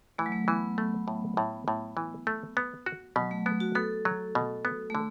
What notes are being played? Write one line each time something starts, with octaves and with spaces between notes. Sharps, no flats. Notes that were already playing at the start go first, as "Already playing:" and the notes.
E3 A3
F#3
A3
E3 B3
A3
A2
A2
A2
E3
A3
B3
F#4
B2 F#3
A3
A3 B3
F#4
B3 A4
F#3
B2
B3
A3
D3